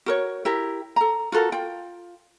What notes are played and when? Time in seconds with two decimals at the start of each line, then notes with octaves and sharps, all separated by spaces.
0.06 F#4 A#4 C#5
0.45 E4 G4 A#4
0.96 A4 A#5
1.32 F4 F#4 A4 A#4
1.52 F4 G5